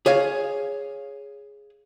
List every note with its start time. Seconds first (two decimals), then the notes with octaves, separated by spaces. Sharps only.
0.06 G#4 C#5 F5